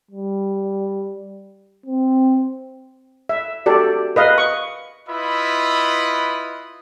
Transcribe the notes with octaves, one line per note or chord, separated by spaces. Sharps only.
G3
C4
E5
F#4 G4 A4 D5
B4 D#5 F5
C#6
E4 F4 B4 D#5 E5 B5